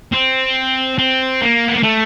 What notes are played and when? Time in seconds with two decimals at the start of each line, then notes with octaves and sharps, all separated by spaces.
0.13 C4
0.98 C4
1.41 A#3
1.68 B3
1.76 A#3
1.83 A3